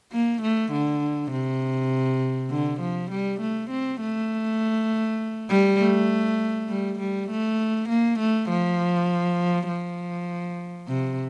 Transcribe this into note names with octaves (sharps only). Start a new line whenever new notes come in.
A#3
A3
D3
C3
D3
F3
G3
A3
C4
A3
G3
A3
G3
G3
A3
A#3
A3
F3
F3
C3